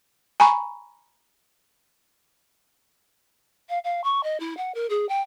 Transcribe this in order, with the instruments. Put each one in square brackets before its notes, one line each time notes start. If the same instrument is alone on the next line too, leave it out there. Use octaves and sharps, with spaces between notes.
[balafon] G#5 A#5 B5 C#6
[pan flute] F5
F5
C#6
D#5
E4
F#5
A#4
G#4
G5